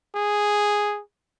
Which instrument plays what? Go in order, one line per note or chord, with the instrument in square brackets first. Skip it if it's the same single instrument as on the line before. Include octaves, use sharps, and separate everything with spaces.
[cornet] G#4